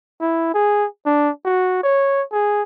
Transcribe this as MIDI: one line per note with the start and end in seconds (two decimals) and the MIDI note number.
0.21 0.49 64
0.54 0.86 68
1.06 1.30 62
1.45 1.79 66
1.83 2.23 73
2.32 2.62 68